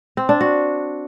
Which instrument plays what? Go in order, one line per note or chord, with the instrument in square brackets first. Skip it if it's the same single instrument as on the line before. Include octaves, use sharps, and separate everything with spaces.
[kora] C4
D4
F#4